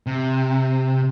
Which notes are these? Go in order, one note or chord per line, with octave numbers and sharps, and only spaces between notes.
C3